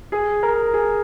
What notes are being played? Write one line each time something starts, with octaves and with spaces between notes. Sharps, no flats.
G#4
A#4
G#4